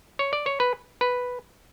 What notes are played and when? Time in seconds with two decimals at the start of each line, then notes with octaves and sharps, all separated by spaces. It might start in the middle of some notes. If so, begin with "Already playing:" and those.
0.19 C#5
0.33 D5
0.46 C#5
0.60 B4
1.01 B4